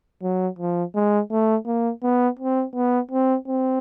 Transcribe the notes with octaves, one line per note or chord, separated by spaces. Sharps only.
F#3
F3
G#3
A3
A#3
B3
C4
B3
C4
C4